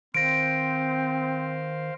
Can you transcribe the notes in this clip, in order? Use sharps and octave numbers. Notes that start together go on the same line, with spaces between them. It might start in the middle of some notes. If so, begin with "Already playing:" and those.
D#3 C4 C5 F5 A#6 D7